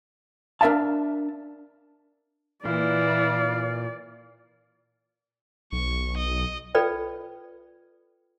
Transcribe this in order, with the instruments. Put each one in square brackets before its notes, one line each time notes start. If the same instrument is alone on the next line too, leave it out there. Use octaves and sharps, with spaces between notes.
[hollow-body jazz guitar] D4 A#4 E5 F5 A5
[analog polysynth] A#2 [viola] E3 [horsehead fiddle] D5 [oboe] F5
[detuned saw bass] B1 [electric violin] C#6
[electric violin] D#5
[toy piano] F4 A4 B4 D5 G5